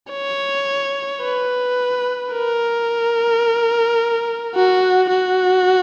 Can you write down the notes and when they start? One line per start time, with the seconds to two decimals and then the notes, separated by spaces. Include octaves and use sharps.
0.11 C#5
1.22 B4
2.32 A#4
4.55 F#4
5.10 F#4